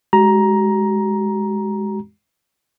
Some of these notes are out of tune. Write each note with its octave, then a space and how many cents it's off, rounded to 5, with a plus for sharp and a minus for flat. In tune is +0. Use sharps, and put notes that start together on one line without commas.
G#3 +0 F#4 +40 A#5 +10